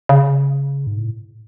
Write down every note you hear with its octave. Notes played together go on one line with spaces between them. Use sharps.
C#3
G#2
A2